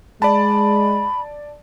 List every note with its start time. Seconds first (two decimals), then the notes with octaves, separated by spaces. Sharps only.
0.22 G#3 D5 A5 B5